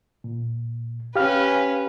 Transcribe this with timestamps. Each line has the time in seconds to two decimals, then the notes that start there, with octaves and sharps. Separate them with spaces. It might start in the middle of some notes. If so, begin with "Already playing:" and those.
0.24 A#2
1.16 C#4 G4 B4 F5 F6